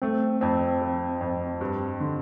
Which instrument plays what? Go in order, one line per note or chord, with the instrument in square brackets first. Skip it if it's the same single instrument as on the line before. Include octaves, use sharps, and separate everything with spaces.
[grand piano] A3 [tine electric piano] C4
[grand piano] F2 [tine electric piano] C4
[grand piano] F3
F2
G2
D3